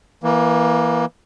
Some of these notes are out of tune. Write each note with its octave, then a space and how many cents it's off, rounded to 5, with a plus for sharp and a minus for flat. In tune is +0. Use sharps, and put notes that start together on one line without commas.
E3 +0 A#3 +25